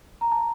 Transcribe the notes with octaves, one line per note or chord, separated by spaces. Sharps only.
A#5
A5